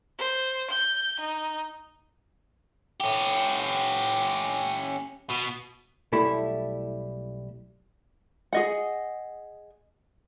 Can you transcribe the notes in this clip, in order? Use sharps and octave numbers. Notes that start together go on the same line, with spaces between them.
C5
G6
D#4
C#4 G4
B2
B1 G3 A3 E4 A5 B5
G#4 D#5 F#5